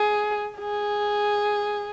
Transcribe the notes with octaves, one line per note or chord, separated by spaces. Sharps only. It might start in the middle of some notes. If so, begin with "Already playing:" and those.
Already playing: G#4
G#4